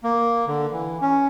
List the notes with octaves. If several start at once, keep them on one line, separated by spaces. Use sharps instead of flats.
A#3
D3
E3
C#4